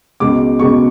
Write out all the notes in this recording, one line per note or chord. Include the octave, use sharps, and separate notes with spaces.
C#2 B2 G#3 D6
C#2 B2 G#3 C#6